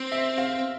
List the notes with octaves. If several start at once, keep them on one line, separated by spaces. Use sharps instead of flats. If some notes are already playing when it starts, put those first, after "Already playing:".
Already playing: C4
E5
F5